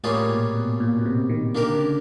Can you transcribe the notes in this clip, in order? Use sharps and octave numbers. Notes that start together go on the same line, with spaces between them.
A2 G3 A#3 C#4 F4 G#4
A#2
B2
A#2
B2
C3
D#3
D3 A#3 D4 G4 A#4
C#3
C#3